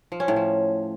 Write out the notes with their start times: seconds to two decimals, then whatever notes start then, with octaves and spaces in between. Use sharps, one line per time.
0.12 F3
0.20 C#4
0.28 A2
0.36 F3